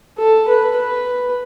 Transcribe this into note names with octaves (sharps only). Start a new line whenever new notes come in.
A4
B4
B4